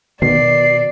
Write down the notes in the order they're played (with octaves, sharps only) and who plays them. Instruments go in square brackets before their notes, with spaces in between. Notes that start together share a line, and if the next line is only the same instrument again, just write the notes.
[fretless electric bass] B2 [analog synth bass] D#3 [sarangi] D5 [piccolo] C7